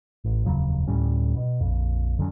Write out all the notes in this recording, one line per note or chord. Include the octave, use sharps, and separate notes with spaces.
A1
D#1 F2 C#3 F#3
D2 A2 G3 C#4
B2
A#1 F2
F#1 D3 F#3 C#4